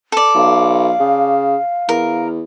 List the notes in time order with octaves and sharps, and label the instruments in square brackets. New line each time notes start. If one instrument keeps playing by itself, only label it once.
[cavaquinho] A4 D5
[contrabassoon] B1 [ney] F5
[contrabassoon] C#3
[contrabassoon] E2 [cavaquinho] A#4